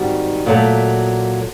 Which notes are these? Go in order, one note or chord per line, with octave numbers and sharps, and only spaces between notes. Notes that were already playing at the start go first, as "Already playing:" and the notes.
Already playing: G#2 D#3 G3 C4 F#4
A#2 F#3 A3